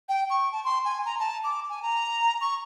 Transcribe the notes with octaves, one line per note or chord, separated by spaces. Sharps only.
G5
C#6
A5
C6
G#5
A#5
A5
D6
G#5
A#5
C#6